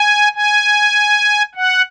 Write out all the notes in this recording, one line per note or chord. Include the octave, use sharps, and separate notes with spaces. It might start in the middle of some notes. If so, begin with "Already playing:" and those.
Already playing: G#5
G#5
F#5